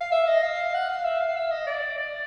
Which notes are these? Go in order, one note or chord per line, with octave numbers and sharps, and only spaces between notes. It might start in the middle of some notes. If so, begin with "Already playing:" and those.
F5
E5
D#5
F5
F#5
F5
E5
F5
E5
D#5
D5
D5